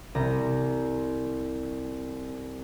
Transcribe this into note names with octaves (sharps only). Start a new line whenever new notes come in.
C2 A#5